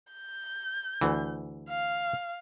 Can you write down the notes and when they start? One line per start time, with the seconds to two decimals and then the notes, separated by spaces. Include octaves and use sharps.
0.13 G6
1.01 D2 E3
1.69 F5